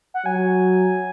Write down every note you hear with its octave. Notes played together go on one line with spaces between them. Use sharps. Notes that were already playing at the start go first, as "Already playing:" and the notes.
F#5
F#3 G#5